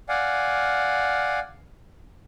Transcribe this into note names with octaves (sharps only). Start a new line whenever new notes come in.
D5 F5 F#5 G#5